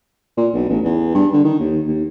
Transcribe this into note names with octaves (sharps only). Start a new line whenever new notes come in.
A#2
B1
A1
E2
G2
D3
D#3
D#2
D#2